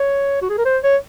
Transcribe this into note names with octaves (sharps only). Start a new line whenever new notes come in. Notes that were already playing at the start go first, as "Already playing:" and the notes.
Already playing: C#5
F#4
G#4
A#4
C5
C#5